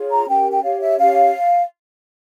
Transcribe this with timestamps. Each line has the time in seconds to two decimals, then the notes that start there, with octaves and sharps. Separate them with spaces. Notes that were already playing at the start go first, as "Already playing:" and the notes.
Already playing: F4 G#4 C#5
0.10 A#5
0.27 C#4 G4 A#4 G5
0.52 G5
0.63 G4 C#5 F5
0.81 E5
0.98 C#4 G4 C#5 F5